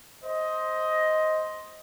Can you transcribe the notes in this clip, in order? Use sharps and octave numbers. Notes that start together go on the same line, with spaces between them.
C5 D#5